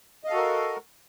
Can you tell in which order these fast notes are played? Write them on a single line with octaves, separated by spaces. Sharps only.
D#5 F5 A4 F#4 A#4